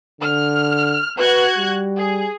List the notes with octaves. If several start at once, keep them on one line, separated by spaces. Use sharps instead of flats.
D3 F6
F#4 B4 F#6 G#6
G3
G#4